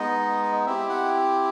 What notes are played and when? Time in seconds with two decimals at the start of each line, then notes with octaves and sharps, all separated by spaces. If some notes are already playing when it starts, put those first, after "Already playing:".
Already playing: G#3 B3 D#4 D#5
0.66 C4 E4 G4 E5
0.89 F#5